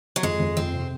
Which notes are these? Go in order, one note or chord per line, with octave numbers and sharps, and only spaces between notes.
F#3
F2 G#3
F2
F2 C4
C3